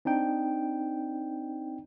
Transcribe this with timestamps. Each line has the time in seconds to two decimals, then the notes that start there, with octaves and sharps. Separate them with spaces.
0.05 C4 D4 D#4 G5